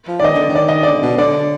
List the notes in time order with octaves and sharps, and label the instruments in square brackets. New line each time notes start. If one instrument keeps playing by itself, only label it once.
[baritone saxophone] F3
[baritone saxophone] D#3 [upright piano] D5 D#5
[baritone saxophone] D3
D#3
[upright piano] D5
D#5
[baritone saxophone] D3 [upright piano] D5
[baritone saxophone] B2
[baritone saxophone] D3 [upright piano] D5